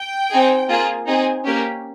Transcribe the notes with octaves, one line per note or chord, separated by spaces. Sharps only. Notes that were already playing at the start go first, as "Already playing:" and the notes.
Already playing: G5
C4 D#4 G#4
A#3 F4 G#4
C4 D#4 G#4
A#3 C#4 G4